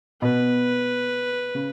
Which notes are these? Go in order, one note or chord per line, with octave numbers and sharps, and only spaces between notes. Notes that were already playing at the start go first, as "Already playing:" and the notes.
B2 B4
C#3